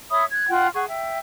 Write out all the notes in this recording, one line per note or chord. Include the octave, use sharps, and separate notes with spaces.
C#5 E5 B5 D#6
F#6 G#6
F4 F#5 G5
G#4 F#5 C#6
E5 G5